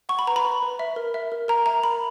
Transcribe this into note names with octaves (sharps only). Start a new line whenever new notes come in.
F#5 C#6
B5
B4 A#5
B5
B4
B4
E5
A#4
E5
A#4
A#4 A#5
E5 A#5
A#4 B5